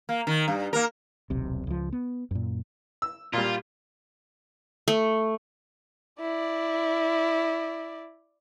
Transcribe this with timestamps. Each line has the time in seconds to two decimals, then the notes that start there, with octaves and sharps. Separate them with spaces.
0.09 A#3
0.27 D#3
0.48 G2
0.73 A#3 A#4
1.30 D#1 B1 C3
1.67 C#2 F3
1.92 B3
2.31 F#2 A#2
3.02 E6
3.33 A#2 G3 F4
4.88 A3
6.20 E4 D5